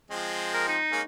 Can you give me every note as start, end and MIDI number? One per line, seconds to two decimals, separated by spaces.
0.11 0.77 53
0.11 0.77 56
0.11 0.77 60
0.54 0.66 70
0.68 1.01 63
0.92 1.02 56
0.92 1.02 58
0.92 1.02 61